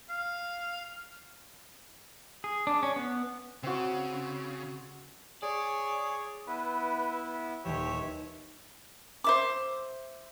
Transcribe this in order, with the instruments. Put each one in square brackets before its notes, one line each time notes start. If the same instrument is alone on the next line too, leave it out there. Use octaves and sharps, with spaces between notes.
[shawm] F5
[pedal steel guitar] G#4
D4
C#4
B3
[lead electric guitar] C#3 [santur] C4 F#4
[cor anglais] G#4 [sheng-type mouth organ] C#5 [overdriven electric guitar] D5
[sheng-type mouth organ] B3 E4 [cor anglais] B4
[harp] D#1 D#2 E3 [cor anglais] G4 [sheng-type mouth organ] C#5 E5
[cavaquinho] C5 E5 D6